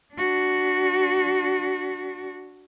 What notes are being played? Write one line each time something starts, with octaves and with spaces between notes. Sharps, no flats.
D4 F#4